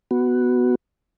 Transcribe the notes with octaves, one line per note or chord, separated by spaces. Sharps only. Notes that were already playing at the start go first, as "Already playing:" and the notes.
B3 F#4